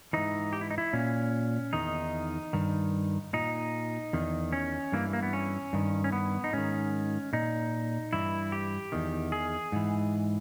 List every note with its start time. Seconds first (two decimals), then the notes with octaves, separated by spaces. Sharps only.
0.13 G#2 E3 D#4
0.53 G4
0.61 E4
0.71 D#4
0.78 E4
0.93 A#2 C#4
1.73 E2 D#3 D#4
2.53 G2 D#3
3.33 A#2 D#4
4.13 E2 D#3
4.53 C#4
4.92 G2 E3 A#3
5.13 A#3
5.23 B3
5.33 C#4
5.73 G2 D#3
6.04 C#4
6.12 B3
6.44 D#4
6.53 G#2 D#3 C#4
7.33 A#2 D#4
8.13 G2 E3 E4
8.52 G4
8.92 E2 D#3
9.32 G#4
9.72 G#2 E3